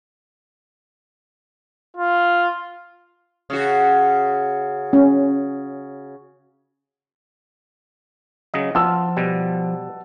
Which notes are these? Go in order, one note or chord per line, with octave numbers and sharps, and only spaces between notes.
F4
C#3 F#4
C#4
C#3 F#3 D#5
F3 F4 F#5 A5 E6
B2 G3